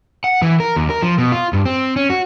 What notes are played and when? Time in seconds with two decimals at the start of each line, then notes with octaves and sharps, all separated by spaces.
0.24 F#5
0.42 E3
0.60 A#4
0.76 D#2
0.90 A#4
1.02 F3
1.18 B2
1.32 F4
1.53 G2
1.65 C4
1.96 C#4
2.10 F#4